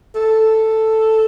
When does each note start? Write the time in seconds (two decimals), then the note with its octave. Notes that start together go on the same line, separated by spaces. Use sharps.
0.15 A4